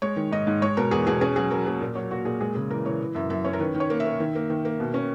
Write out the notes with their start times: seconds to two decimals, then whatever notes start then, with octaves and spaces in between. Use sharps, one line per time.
0.02 G#3 C#5
0.16 D#3
0.31 G#2 D#5
0.47 G#2
0.62 G#3 C#5
0.77 B2 A#4
0.91 E2 G#4
1.07 B2 G#4
1.21 C#4 G#4
1.36 F#3 G#4
1.51 F#3 A#4
1.67 A#3 G#4
1.81 A#2
1.95 F#3 C#5
2.11 A#2 F#4
2.25 A#2 G#4
2.40 G#3 G#4
2.55 C#3 G#4
2.70 E3 A#4
2.85 E3 C#5
3.01 E3
3.15 F#2 E5
3.30 F#2 E5
3.45 C#4 C#5
3.53 A#4
3.59 D#3 B4
3.75 D#3
3.80 C#5
3.90 A#3
4.00 E5
4.05 A#3
4.20 D#3
4.35 A#3
4.50 D#3
4.65 A#3
4.80 B2
4.94 C#4